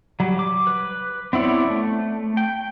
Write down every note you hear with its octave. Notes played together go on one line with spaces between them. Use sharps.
F#3 G3
D6
B4
B3 C4 E4 C#5 D5
A3
G5